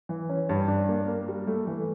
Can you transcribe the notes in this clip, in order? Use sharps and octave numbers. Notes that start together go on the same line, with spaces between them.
E3
C#4
G2
D4
A#3
A#3
G3
A3
E3